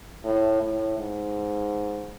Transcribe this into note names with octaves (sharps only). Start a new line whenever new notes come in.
A2
A2
G#2